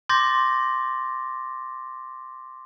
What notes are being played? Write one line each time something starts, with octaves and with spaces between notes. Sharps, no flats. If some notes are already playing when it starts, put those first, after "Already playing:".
C6 D6 G6 A6 A#6